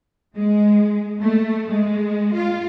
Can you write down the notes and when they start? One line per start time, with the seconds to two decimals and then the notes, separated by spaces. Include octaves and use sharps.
0.36 G#3
1.20 A3
1.70 G#3
2.35 F4